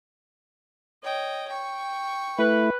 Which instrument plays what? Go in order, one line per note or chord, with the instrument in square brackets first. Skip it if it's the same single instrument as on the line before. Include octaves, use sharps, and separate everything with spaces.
[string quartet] C#5 D#5 G5
G5 C#6
[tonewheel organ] A3 E4 [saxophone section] B4